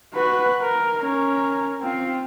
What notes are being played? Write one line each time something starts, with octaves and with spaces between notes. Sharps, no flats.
F#4 B4
A#4
C#4 A#4
C4 F4